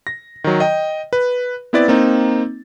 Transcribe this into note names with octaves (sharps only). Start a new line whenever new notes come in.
A#6
D#3 F#3
D#5 G5
B4
B3 C4 E4 B4 D5 A6
A#3 C4 D#4